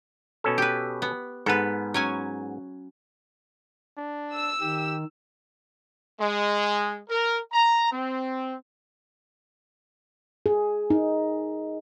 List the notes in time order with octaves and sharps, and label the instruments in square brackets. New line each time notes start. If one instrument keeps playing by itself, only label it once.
[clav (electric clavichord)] B2 C#4 A4
[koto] G4 B4
B3
[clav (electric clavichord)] G#2 B3 [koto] A4 B4
[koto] F#3 C#4 G#5
[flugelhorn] D4
[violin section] E6
[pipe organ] D#3 [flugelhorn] G4
[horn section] G#3
A#4
A#5
C4
[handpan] G#4
D#4